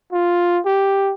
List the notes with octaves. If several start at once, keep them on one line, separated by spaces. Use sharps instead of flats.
F4
G4